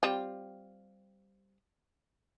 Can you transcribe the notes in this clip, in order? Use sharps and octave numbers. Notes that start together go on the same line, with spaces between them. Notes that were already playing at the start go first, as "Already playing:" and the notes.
G3 C4 F4